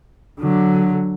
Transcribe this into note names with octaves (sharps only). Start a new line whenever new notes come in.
D3 F#3